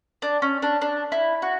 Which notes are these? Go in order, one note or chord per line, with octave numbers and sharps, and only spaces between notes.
D4
C#4
D4
D4
E4
F#4